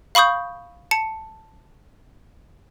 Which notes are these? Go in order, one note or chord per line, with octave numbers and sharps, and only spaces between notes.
F5 B5 C#6 D#6 G6
A5 C#7